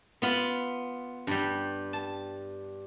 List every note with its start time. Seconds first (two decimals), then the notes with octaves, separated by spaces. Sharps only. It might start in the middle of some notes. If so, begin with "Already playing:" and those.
0.22 B3 F4 B5
1.27 G2 G3
1.93 A5